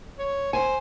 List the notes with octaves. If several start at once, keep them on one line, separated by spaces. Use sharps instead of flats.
C#5
C5 G#5